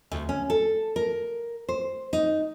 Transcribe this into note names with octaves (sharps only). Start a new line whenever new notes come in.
D2
C#4
A4
A#4
C5
D#4